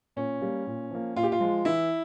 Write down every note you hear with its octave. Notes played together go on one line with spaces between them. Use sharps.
A#2 C#4
G3 A#3
A#2
F3 A#3
A#2 F4
G4
F4
F3 G#3
E3 E4